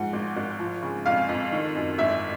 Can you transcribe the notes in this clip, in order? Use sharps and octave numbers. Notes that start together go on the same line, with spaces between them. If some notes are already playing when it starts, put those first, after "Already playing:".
Already playing: G#2 F3 F#5
G#1
G#1
F3
C#3
F2 F5
F2
D#3
F#2
G#1 E5